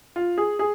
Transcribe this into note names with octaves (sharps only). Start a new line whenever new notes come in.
F4
G#4
G#4